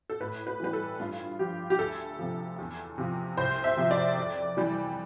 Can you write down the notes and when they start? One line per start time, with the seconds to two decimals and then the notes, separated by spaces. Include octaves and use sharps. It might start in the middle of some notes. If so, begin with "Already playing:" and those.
0.10 A4
0.20 A2 B4
0.47 B4
0.60 E3 G3 B4
0.73 A4
1.00 G2 F4
1.39 F3 G4
1.70 G4
1.79 D2 A4
2.19 C3 F3
2.59 E2
2.98 C3 F3
3.37 C2 C5
3.64 E5
3.77 C3 F3
3.91 D5
4.17 F2
4.57 E3 G3